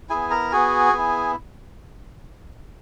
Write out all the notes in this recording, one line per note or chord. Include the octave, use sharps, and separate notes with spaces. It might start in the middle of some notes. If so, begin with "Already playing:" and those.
B3 E4 G#4 G#5
A#4 A#5
B3 F#4 G#4 G#5
B3 E4